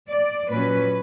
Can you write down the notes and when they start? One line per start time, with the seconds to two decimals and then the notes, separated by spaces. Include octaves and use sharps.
0.08 D5
0.50 A#2 F#3 C#4 B4